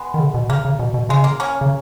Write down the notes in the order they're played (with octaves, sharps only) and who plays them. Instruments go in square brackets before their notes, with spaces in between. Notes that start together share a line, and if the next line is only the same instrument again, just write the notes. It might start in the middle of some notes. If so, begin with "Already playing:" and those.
Already playing: [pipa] G#3 B3
[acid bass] D#3
C#3
B2
[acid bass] C#3 [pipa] A#3
[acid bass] C#3
B2
B2
[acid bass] C#3 [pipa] G#3
[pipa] A#3
A#3 C#4
[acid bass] C#3